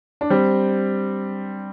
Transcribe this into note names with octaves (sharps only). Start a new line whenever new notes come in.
D4
G3 C4